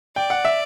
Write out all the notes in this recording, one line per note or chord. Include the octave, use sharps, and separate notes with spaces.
D5 G5
F#5
E5